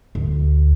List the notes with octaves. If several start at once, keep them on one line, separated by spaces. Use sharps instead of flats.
D2